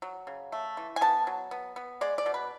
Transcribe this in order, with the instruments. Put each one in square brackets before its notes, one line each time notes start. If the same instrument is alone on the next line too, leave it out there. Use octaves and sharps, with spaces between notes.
[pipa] F#3
C#3
A3
E3
G#5
B3 A5
F#3
B3
B3
G#3 D5
D5
B2
B4